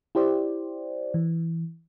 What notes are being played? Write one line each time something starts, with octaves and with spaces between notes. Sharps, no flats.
E4 G4 C5 D5
E3